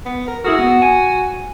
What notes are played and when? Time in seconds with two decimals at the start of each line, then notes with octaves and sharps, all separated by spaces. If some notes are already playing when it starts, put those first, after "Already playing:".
0.06 B3
0.28 A#4
0.45 E4 F#4 G#4 A#4
0.59 B3
0.82 G#5